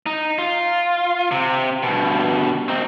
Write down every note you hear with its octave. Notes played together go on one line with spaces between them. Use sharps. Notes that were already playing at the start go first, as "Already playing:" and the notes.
D#4
F4
C3
G2 B2
C4 D#4